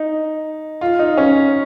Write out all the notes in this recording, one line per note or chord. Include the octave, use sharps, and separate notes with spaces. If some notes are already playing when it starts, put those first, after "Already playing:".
Already playing: D#4
F4
D#4
C#4